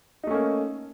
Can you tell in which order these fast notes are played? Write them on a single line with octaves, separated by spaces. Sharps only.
D#4 A3 C#4 A#3